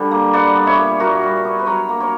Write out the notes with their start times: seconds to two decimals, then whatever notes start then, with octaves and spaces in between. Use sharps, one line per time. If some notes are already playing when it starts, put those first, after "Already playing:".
Already playing: D3 G3
0.11 A#3
0.33 G3 D5 F#5
0.56 B3
0.66 C#5 E5
0.77 A#2
0.99 A#2 F#4 A#4
1.23 G3
1.44 B3
1.59 B4
1.66 F#3 A#4 C#5
1.89 A#3
2.00 A#4 C#5